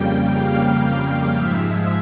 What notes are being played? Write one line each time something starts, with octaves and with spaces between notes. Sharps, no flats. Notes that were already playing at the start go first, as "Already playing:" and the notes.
Already playing: F2 C#3 G3 A#3 G5
F5
G#2 F3 G#3 E5